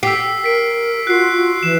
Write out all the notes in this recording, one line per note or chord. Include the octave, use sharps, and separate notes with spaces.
G4 E6 B6 C7
A#4 B6 D7
F4 F#4 F#6 C7
F4
E3 E7